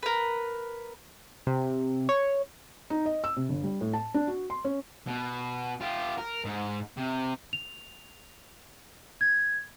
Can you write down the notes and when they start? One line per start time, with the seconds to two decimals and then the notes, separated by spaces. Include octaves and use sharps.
0.03 A#4 B4
1.47 C3
2.09 C#5
2.90 D#4
3.06 D#5
3.24 E6
3.37 C3
3.49 G1
3.63 G3
3.81 A2
3.93 A5
4.14 D4
4.27 F#4
4.50 C6
4.65 C#4
5.07 B2
5.81 F4 G4
6.18 A#4
6.45 G#2
6.97 C3
7.53 F7
9.21 G#6